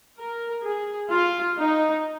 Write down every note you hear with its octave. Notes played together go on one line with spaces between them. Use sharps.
A#4
G#4
F4
D#4